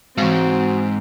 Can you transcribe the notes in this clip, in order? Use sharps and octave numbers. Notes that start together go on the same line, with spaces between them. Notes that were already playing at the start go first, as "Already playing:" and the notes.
G#2 E3 G#3 C4 F#4